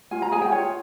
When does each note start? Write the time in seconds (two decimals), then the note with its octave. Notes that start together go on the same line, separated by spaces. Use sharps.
0.11 F4 G#5
0.22 A#5
0.32 G#4 G#5
0.42 G5
0.52 F4 C#5